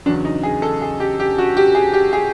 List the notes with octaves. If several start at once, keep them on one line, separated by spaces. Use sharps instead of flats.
E2 C#3 F#3 D4
D#4
G#4
A4
G#4
G4
G4
F#4
G4
G#4
G4
G#4